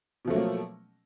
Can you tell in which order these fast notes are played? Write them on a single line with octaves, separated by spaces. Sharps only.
B2 F3 A3 F#3 A#3